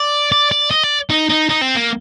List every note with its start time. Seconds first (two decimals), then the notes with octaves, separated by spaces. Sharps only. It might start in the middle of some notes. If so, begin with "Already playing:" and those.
Already playing: D5
0.32 D5
0.51 D5
0.71 D#5
0.84 D5
1.10 D#4
1.29 D#4
1.49 D#4
1.61 C4
1.75 A#3